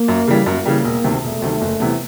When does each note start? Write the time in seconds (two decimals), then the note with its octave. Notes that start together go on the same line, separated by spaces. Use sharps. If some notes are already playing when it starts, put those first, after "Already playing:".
Already playing: A#3
0.08 F#2
0.28 C#3 E3 G3
0.46 F#2 A#3
0.66 C#3 E3 G3
0.84 E1
1.04 D2 C3 D#3
1.23 E1 A3
1.42 D2 C3 D#3
1.62 F#1
1.80 E2 C3 E3